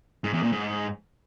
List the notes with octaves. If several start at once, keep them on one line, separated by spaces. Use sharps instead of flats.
G#2
E2
A#2
G#2